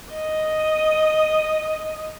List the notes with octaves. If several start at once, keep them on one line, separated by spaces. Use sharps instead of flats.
D#5 D#6